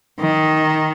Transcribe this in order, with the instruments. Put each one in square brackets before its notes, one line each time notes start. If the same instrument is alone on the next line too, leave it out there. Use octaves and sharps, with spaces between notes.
[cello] D#3